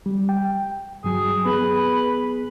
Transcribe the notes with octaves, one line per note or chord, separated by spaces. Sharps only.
G3
G5
G2 F#3 G#4
B3 G#4 B4